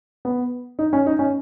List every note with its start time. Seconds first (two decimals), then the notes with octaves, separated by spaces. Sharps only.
0.25 B3
0.79 D#4
0.93 C#4
1.06 D#4
1.19 C#4